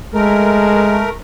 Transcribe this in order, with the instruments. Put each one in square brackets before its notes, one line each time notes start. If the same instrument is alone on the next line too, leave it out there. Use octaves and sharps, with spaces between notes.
[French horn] G#3 [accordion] A3 A#4